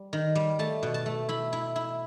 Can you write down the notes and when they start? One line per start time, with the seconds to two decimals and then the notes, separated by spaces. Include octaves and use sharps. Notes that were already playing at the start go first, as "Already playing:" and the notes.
Already playing: G3
0.13 D#3
0.35 G3
0.59 A3 A5
0.83 B2
0.94 A5
1.06 A3
1.29 E4 B5
1.53 E4
1.76 E4